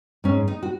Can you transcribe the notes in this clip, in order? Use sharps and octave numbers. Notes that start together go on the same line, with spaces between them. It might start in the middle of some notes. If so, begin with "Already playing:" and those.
G#2 C#4
D#4
F#4